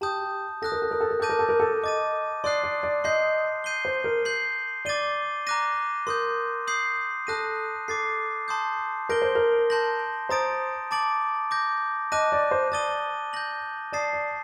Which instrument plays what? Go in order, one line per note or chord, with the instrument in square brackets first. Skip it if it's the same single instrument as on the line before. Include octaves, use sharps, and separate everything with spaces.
[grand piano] G4 [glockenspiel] A5 D#6 G6
[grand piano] A4 [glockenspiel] D#6 F#6 A#6
[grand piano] A#4
A4
A#4
A4
A#4
[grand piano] A4 [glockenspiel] A5 D6 G6 A#6 D#7
[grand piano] A#4
A4
A#4
A4
[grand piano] D#5 [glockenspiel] D6 A6 D#7
[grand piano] D5 [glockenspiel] C6 D#6 F#6 C7
[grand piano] D5
D5
[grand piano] D#5 [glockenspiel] C6 G6 C7
[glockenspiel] G6 C7 D#7 G7
[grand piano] C5
A#4
[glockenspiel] G6 C7 F#7
[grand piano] D5 [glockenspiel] D6 A6 D#7 G7
[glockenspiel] A#5 D6 F#6 A#6 D#7
[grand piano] A#4 [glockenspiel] C6 D#6 G6
[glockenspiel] D#6 G6 C7 F#7
[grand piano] A4 [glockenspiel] A5 D#6 F#6 A#6 D#7
[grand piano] A4 [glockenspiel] D6 A6 C7
[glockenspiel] A5 C6 D#6 G6
[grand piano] A#4 [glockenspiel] G6 A#6 D7 G7
[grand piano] C5
A#4
[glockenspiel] A5 C6 G6 A#6 F#7
[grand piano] C5 [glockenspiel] A#5 D#6 A6 D7
[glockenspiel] A5 D6 A6 D7 F#7
D6 G6 A#6
[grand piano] D#5 [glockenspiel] A5 D6 F#6 A#6 D#7
[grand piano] D5
C5
[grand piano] D5 [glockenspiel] A5 D#6 A6 D#7 G7
[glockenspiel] G6 A#6 F#7
[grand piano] D5 [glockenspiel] A5 D#6 A6 C7
[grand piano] D5